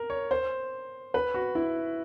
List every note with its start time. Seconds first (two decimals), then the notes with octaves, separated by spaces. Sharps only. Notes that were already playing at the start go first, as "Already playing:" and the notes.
Already playing: A#4
0.10 C#5
0.31 C5
1.14 B4
1.34 F#4
1.55 E4